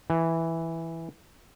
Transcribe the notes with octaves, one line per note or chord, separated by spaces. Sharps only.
E3